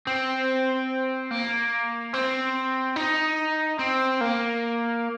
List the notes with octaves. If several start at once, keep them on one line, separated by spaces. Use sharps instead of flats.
C4
A#3
C4
D#4
C4
A#3